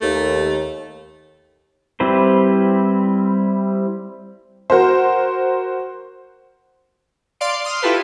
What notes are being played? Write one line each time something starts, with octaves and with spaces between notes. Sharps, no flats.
D#2 A3
G3 C4 E4 B4 C5
F#4 A#4 C5
D5 F5 C6 D7
C6 D#6 F6
E4 F4 G4 A4 B4